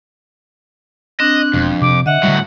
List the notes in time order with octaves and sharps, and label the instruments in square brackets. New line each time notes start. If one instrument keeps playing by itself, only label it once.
[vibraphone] C4 D4 [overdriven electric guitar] D#5 [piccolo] F#6
[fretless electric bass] E1 B2 [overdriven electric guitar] F2
[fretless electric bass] C3 [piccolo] D6
[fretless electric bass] D3 [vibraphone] D#5 E5 [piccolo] F#5
[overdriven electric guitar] A2 F#3 [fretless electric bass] D3 G3